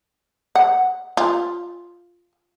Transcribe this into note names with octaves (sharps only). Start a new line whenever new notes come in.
F#5
F4